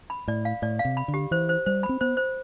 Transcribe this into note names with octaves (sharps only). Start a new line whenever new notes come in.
B5
A2 D5
F5
A2 D5
F5
C3
B5
D3
G4
E3 C5
C5
G3 C5
B5
C4
B3 C5
C5